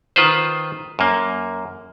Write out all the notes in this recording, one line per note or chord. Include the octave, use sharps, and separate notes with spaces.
D#3 F4 B4 C5
F#2 A#3